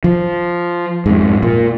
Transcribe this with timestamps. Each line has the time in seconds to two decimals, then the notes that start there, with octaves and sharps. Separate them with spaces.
0.04 F3
1.06 F2 G#2
1.43 A#2